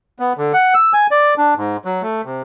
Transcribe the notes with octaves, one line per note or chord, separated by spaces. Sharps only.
B3
D3
F#5
E6
G#5
D5
D4
G#2
F#3
A3
C3